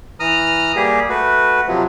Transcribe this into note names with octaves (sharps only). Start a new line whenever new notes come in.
E3 A#5 D#6 F6
G3 A#3 G4 G#4
A3 F#4 B4
C3 F3 F#3